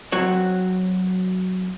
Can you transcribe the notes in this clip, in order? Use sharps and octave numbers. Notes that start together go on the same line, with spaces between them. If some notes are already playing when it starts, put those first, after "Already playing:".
F#3 C4 F#4 C#5